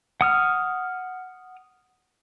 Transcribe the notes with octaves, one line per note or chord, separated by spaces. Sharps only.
F#5 D#6 F6